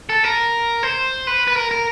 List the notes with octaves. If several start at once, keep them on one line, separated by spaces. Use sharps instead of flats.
A4
A#4
C5
B4
B4
A#4
A#4